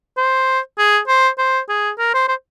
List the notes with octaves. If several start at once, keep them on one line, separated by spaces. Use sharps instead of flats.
C5
G#4
C5
C5
G#4
A#4
C5
C5